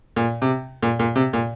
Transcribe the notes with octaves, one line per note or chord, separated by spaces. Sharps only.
A#2
C3
A#2
A#2
C3
A#2